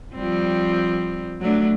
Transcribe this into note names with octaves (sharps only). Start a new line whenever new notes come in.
F3 G3 C4
F#3 A3 D4